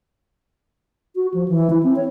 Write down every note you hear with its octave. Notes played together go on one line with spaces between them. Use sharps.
F#4
F3
E3
E4
C4
C#5